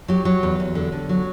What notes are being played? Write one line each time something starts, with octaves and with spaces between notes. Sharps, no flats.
F#3 G4
F#3
E2
E2
D3
D3
F#3